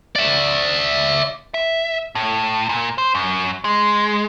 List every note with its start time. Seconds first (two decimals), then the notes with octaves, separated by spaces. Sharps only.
0.16 D5 E5
1.54 E5
2.15 A2
2.69 A#2
2.98 C5
3.15 F#2
3.65 G#3